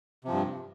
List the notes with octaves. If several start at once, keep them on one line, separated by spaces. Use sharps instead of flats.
G2 C3 F3